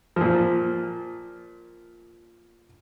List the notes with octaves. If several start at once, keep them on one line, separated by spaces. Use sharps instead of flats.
A#2 F3